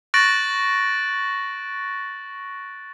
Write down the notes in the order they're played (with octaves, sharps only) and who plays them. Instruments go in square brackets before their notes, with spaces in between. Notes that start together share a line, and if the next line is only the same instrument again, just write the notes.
[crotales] C#6 F#6 A6 A#6 D7 F#7